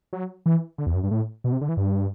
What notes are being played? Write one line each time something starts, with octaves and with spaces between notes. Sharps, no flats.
F#3
E3
D3
E2
F#2
G2
A2
B2
C3
D3
E3
G2